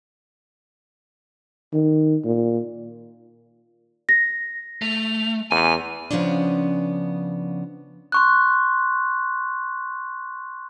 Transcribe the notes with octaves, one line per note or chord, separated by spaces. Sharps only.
D#3
A#2
A#6
A3 F7
E2 G#5 D#7
C#3 F3 B3 C#4 D4
C6 C#6 F#6